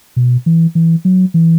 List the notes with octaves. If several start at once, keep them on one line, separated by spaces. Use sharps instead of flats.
B2
E3
E3
F#3
E3